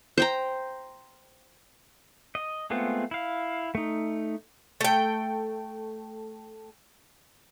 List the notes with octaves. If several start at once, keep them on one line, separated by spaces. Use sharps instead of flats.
C5 G5 A#5
D#5
G#3 A3 B3 C4 F4
E4 F5
A3 D#4
A3 G5